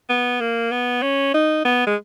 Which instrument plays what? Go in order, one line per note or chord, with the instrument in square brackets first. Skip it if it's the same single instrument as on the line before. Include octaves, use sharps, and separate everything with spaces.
[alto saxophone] B3
A#3
B3
C#4
D#4
B3
G#3